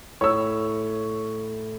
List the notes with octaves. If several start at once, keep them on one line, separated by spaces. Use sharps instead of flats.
A2 C#5 E6